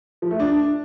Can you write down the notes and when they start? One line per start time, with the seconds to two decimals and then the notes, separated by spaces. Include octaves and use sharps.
0.22 F3
0.31 A3
0.39 D4